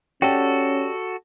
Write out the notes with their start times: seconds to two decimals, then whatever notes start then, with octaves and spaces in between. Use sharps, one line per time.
0.22 C#4 F#4 G4 A4 D5 G5